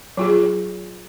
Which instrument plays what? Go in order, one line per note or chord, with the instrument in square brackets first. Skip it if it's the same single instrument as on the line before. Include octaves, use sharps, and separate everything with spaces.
[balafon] F#3 F4 G#4